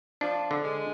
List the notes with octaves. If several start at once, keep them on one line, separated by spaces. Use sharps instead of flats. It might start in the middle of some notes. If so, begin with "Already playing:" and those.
F3 D4
D3
G#3